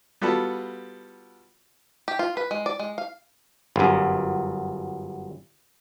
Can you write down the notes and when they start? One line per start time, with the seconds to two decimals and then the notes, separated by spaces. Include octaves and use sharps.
0.21 G3 B3 F4 F#4 A4
2.08 G4
2.19 F4
2.37 B4
2.51 G#3
2.66 D5
2.79 G#3
2.98 F5
3.76 G1 F#2